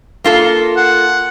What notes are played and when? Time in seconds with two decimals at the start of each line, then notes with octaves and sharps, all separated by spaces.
0.24 A#3 F4 A4
0.77 F#5